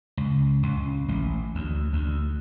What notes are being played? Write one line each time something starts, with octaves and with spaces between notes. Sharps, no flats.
C#2
C#2
A1
D2
D2